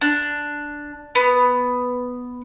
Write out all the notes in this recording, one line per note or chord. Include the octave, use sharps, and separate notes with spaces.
D4
B3